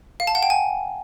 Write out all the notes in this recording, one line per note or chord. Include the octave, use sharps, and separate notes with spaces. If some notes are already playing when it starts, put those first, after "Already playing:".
F5
A5
F#5
G5
G#5